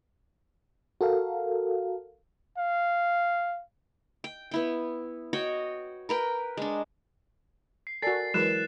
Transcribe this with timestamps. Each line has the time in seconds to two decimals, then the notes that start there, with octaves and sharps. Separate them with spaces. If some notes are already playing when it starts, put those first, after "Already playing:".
1.01 F#4 A4 A#4 F5
2.58 F5
4.24 G5
4.51 B3 E4 G5
5.33 F#4 C#5 D#5 G5
6.09 A#4 B4 G5
6.57 G#3 D4
7.87 C7
8.02 F#4 A4 A#4 D5 G#5 A6 C7
8.34 E3 F#3 G#3 E4 A#4 B4 F#6 E7